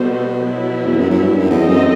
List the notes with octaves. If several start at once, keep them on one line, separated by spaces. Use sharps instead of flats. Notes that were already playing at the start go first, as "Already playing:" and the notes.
Already playing: B2 G3 B3 F#4 A4 C5
F#3 B3 E4
E2
F#2
F#2
G2
F#2
E2 C4 D#4 A4 D#5
F#2